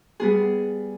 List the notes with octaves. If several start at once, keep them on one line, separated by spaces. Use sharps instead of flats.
G3 B3 G#4